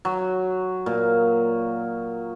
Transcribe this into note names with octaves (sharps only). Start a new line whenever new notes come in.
F#3
A#2